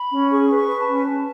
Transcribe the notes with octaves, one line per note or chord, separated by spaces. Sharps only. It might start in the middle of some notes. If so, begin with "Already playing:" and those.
Already playing: B5
C#4
G#4 C#6
B4
C#6
B4
A5
C#4
C#4